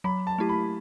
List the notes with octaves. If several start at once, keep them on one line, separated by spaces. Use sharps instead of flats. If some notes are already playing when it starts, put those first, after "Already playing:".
F#3 B5
A5
A3 E4 G4
B5